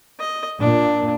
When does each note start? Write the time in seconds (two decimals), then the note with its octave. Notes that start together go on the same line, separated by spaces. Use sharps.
0.20 D#5
0.60 A#2 D4